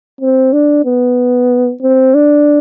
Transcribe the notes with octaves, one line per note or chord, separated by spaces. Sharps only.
C4
D4
B3
C4
D4